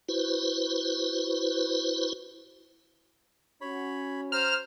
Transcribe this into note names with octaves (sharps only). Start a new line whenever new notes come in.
E4 F#4 B4 C5
C#4 F#4 C#5 B5
C5 A#5 F6